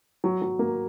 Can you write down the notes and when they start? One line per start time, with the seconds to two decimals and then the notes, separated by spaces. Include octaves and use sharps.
0.24 F#3
0.42 F#3
0.59 A#3